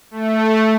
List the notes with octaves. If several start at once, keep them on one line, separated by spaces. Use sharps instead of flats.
A3